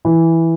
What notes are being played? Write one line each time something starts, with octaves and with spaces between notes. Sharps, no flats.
E3